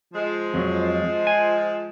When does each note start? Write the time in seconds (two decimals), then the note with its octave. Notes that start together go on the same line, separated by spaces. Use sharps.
0.14 F3 G#3
0.54 F2 F#3
1.27 G#5